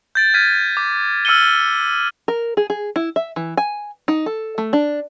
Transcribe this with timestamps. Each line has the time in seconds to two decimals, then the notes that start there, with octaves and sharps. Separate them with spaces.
0.15 G6 A6 D7
0.34 F6 G#6 B6 D#7
0.77 D6
1.25 E6 F6 G6 C#7 D#7 G7
2.28 A#4
2.57 G#4
2.70 G#4
2.96 E4
3.16 E5
3.36 E3
3.57 G#5
4.08 D#4
4.26 A4
4.58 A3
4.73 D4